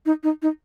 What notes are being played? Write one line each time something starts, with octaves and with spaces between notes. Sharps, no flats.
D#4
D#4
D#4